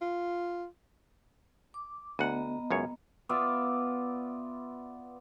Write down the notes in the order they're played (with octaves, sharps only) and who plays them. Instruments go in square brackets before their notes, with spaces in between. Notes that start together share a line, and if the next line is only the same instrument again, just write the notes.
[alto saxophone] F4
[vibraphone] D6
[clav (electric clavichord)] D2 F#5 [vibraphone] B3 D#5 A#5
[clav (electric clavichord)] C#2 F#2 C#5
[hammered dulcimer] B3 F4 D5 E5